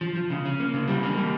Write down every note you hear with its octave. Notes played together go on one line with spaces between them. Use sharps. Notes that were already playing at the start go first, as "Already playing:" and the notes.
F3
F3
C#3
C#4
A#3
C#3
G3
A#3
G3